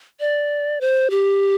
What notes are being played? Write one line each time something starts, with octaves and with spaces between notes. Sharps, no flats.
D5
C5
G4